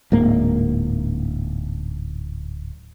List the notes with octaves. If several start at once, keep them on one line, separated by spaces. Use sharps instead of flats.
D1 G#2 A#3